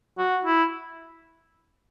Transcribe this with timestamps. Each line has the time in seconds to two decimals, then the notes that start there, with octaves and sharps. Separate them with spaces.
0.18 F#4
0.45 E4